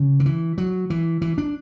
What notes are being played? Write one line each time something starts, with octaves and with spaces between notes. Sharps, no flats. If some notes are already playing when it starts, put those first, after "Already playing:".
Already playing: C#3
D3
E3
F#3
E3
E3
D4